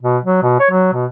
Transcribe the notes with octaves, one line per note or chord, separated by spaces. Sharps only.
B2
F#3
B2
C#5
F#3
B2